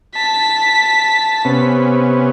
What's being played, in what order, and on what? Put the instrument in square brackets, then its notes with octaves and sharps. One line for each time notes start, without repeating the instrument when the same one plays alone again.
[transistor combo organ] A5 [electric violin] B6
[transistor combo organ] C3 B3 C#4